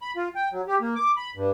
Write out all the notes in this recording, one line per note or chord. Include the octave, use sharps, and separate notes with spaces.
B5
F4
G5
F#3
G4
A#3
D6
B5
G2